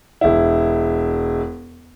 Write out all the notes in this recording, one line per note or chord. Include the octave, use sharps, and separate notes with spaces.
E1 E4